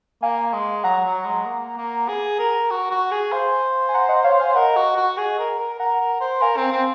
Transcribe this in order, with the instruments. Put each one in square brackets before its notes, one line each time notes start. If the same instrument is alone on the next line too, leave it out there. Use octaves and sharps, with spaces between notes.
[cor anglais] A#3 [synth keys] F5 G#5
[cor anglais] G#3
[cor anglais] F#3 [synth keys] F#5 A#5
[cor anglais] F#3
G#3
A#3
A#3
G#4
A#4
F#4
F#4
G#4
[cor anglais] C5 [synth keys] F5 G#5
[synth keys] G#5
F#5 A#5
D#5 F#5
C#5 F5
F5 G#5
[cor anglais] A#4 [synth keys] D#5 F#5
[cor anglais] F#4
F#4
G#4
A#4
A#4
[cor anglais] A#4 [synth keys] F#5 A#5
[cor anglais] A#4
C5
[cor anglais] A#4 [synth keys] F5 G#5
[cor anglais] C4
C4